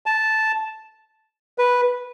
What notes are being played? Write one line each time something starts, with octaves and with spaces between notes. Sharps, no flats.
A5
B4